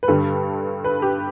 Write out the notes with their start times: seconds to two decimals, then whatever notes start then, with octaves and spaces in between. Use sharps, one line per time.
0.03 B4
0.08 G2 D3 G3 A4
0.84 B4
1.02 G4